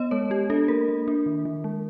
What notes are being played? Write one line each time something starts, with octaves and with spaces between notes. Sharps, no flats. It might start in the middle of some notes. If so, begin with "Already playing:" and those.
Already playing: B3 D#5
G#3 C#5
G#3 G4
D4 A4
A#3 A#4
A#3
D4
D#3
D#3
G#3